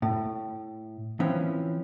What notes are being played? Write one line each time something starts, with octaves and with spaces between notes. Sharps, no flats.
A2
E3 F3 C4 C#4